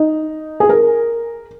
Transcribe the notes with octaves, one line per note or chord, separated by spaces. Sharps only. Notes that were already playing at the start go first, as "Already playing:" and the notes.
Already playing: D#4
G#4
A#4